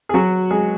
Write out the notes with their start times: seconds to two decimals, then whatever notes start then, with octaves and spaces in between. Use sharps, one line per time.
0.09 G#4
0.14 F#3 F#4
0.51 G#3 G#4